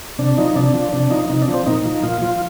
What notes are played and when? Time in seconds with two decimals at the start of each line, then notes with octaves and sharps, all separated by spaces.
0.19 C3 D4
0.37 F3 D#4
0.55 C3 D4
0.74 F3
0.93 C3 D4
1.11 F3 D#4
1.30 C3 D#4
1.42 D4
1.48 F3
1.54 C4
1.66 A#2 D#4
1.85 F3
2.03 A#2 F4
2.21 F3 F4